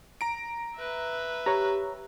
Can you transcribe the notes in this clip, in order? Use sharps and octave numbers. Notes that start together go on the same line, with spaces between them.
A#5 D7
B4 E5
G4 C#5 A#5